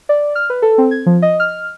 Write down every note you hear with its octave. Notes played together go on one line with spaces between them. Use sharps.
D5
F6
B4
A4
C4
G#6
F3
D#5
F6